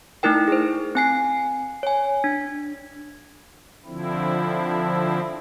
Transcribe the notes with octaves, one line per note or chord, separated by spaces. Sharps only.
A3 D#4 E4 A#4 G5
G#4 C5
C4 G#5 C7
C#5 G#5
D4
D3 F3 C4 E4